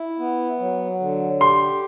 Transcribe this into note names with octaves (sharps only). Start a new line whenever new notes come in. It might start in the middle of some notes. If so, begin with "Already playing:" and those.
Already playing: E4
B3
F#3
D3
G4 C6